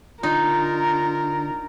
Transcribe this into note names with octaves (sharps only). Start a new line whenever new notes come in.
D3 D4 D#4 F4 A#4